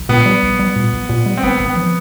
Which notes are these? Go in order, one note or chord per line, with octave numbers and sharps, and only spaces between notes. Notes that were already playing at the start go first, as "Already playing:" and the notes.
Already playing: B1
A#2 B3
G3
B1
G3
A#2
B1
A#2
G3
C4
G#1 B3
G#1
B3
F3